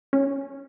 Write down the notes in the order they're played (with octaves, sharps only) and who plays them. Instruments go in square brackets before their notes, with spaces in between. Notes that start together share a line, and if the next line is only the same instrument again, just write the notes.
[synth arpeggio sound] C#4